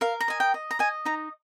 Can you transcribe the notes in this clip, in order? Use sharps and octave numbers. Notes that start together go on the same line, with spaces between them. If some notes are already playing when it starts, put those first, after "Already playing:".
A#4 F5
A#5
D#5 G#5
G5
D#5
A#5
D#5 G#5
D#4 A#5